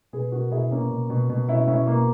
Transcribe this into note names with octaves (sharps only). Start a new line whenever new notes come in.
B2 G#4 B4
B2 F#4 A#4
B2 E4 G#4
B2 A#3 C#4
B2
B2
B2
B2 C#4 E4
B2 C#4 E4
B2 A#3